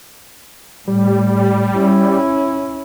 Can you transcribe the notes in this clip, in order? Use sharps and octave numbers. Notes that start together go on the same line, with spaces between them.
A2 G3
C#4 E4